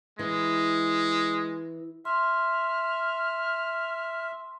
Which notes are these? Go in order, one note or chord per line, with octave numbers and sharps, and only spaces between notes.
E3 G#3
E5 C6 F6